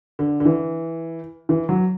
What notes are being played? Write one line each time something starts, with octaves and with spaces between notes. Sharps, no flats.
D3
D3
E3
E3
F#3